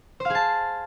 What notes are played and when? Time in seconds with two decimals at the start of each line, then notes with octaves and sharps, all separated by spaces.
0.20 C5
0.25 F5
0.30 G#4
0.35 A5